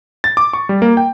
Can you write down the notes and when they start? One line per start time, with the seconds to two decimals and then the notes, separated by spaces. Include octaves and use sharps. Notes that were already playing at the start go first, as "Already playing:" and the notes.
0.24 A6
0.37 D6
0.53 C#6
0.69 G3
0.82 A#3
0.97 G5